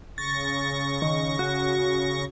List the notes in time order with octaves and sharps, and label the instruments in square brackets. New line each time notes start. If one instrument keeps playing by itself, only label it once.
[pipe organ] C#3 C#6 A#6 [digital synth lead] A6
[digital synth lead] D#3
F#4